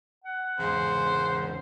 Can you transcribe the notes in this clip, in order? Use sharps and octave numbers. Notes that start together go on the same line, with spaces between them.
F#5
E2 G#2 C#3 C5